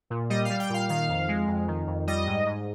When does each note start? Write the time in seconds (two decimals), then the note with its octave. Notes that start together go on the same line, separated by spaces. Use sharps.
0.10 A#2
0.30 G3 D#5
0.45 F5
0.50 G3
0.60 G5
0.70 A#2 F5
0.89 D#3 F5
1.09 F2
1.29 G#3
1.48 F2
1.68 D#3
1.87 F2
2.07 G3 D#5
2.27 G#2
2.46 G#2